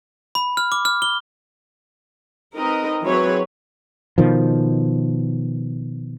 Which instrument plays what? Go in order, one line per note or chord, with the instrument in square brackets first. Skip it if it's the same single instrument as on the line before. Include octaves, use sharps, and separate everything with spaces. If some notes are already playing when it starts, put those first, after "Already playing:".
[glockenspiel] B5
F6
D6
F6
G7
[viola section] C4 D#4 A#4 B4 D#5
E3 F#3 C4 G#4 B4 C#5
[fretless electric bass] B2 D#3 F3